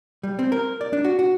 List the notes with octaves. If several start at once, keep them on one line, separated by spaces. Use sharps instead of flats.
G3
C4
A#4
D5
D4
F#4
F#4